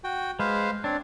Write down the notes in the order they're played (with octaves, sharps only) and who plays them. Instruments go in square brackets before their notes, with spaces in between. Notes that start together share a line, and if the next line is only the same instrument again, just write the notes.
[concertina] F#4 G5
[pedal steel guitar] G#3 [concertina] B4 C5 F5
[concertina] C4 C#5 [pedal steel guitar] D4